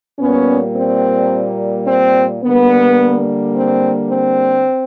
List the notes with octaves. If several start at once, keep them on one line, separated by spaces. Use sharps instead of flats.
A#2 G3 A#3 B3 C#4
C4
C4
D3 G3 A#3 B3
C4
C4